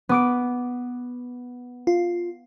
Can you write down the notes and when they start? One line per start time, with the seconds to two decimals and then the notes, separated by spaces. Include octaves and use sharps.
0.09 B3 D6 D7
1.87 F4